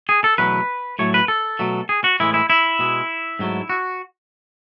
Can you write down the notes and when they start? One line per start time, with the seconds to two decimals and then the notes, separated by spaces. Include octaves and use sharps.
0.09 G#4
0.24 A4
0.38 E2 B2 F#3 A3 B4
0.99 A2 F#3 A3 C#5
1.14 B4
1.28 A4
1.59 B2 F#3 A3
1.89 G#4
2.04 F#4
2.20 A2 E3 G#3 E4
2.34 E4
2.50 E4
2.79 B2 G#3
3.39 G#2 F#3 A3
3.70 F#4